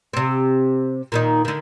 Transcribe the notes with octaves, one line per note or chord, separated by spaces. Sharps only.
C3 C4
A#2 D#3 D#4
D3 D#3